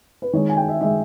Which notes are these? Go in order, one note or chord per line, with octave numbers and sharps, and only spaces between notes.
B4
D#3 G#3 C#5
G#5
G5
E5
D#3 G#3 E5